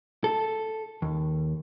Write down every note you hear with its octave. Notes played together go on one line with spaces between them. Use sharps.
A4
D#2